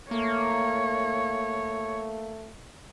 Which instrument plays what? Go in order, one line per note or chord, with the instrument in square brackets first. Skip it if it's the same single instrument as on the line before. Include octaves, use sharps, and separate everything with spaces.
[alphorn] A3 [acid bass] A#3 [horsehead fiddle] C#5